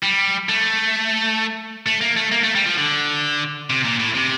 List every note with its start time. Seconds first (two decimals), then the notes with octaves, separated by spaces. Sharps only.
0.03 G3
0.49 A3
1.86 A3
2.01 A#3
2.16 A3
2.31 A#3
2.43 A3
2.55 G3
2.66 F3
2.78 D3
3.70 C3
3.85 A#2
4.00 A2
4.15 C3